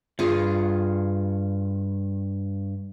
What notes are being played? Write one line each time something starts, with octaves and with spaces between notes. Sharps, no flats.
G2 F4 G#4